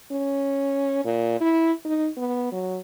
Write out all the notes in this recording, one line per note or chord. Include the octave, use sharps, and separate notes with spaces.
C#4
A#2
E4
D#4
B3
F#3